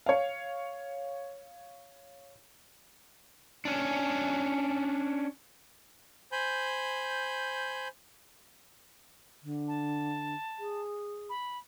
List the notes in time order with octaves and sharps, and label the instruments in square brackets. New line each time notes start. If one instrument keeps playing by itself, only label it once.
[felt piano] C#5 F5
[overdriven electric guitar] C#4 D4
[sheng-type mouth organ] C5 G#5 B5 G6
[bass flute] D3
[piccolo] A5
[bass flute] G#4
[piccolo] B5